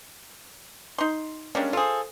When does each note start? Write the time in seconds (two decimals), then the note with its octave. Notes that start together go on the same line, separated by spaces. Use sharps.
0.98 D#4 C6
1.55 G3 G#3 A#3 C#4 D4
1.73 F4 G#4 A4 C5